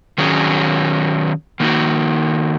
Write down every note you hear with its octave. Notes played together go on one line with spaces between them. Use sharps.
D#3 F#3 C#4 G#4
D#3 A#3 D#4 F#4